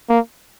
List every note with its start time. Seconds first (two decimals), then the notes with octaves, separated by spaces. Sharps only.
0.09 A#3